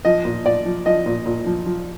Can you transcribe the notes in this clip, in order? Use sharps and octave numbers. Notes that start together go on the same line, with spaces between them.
F3 D#5
A#2
A#2 D5
F3
F3 D#5
A#2
A#2
F3
F3